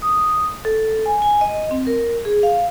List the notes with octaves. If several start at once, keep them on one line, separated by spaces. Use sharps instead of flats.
D#6
A4
G#5
G#5
D#5
C4
A#4
G#4
F5